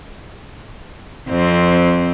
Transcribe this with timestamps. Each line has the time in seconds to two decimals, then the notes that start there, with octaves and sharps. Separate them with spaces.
1.28 F2 C4